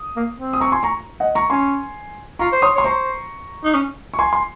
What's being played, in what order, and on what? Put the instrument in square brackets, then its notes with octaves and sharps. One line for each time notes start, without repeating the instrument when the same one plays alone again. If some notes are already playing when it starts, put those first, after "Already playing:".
Already playing: [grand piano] D#6
[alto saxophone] A#3
C4
[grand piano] D#6
A#5 C#6
G#5 C6
A#5 C#6
D#5 F#5
A#5 C#6
[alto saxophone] C#4 [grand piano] G#5 C6
[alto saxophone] F4 [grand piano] A#5 C#6
[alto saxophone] C5
[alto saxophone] C#5 [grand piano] C6 D#6
[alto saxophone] C#5 [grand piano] C6
[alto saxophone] C5 [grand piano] A#5 C#6
[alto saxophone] D#4
C#4
[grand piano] C#6
G#5 C6
C6